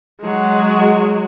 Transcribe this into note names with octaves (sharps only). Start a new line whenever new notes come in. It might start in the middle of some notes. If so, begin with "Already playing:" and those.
F#3 G#3